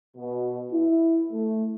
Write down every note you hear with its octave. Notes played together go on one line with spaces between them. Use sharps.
B2
E4
A3